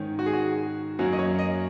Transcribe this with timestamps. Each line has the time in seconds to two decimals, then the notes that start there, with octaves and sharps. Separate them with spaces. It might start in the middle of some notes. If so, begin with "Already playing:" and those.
Already playing: G#2 D#3 C#4
0.19 F#4
0.26 G#4
0.33 F#4
0.99 F#2 F#3 A#3 C#4 F#4
1.12 D#5
1.19 C#5
1.39 D#5